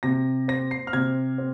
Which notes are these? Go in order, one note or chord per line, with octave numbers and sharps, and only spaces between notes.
C3 A#6
C4 A#6
C7
F6
C3 G#6
C4